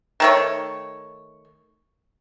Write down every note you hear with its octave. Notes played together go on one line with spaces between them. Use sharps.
D#3 A3 C#5